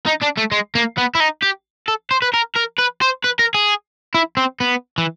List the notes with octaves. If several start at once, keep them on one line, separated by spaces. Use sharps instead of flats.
D#4
D4
A3
G#3
A#3
B3
E4
D#4
G4
A4
C5
B4
A#4
A#4
B4
C5
B4
A#4
G#4
E4
C4
B3
E3